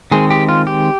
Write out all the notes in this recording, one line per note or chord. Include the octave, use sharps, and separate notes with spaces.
D#3 G#3 C4 G#4
G4
F4
G4